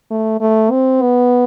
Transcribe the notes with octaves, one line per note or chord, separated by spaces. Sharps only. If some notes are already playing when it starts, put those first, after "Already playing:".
A3
A3
C4
B3